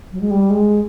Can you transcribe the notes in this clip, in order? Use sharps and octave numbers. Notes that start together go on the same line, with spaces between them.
F#3
G#3
G3
G#3